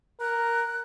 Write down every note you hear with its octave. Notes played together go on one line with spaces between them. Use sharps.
A#4 F#6